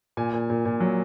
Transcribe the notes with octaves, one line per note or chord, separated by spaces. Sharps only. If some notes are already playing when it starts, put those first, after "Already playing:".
A#2 G#5
A#2
A#2
A#2
F#3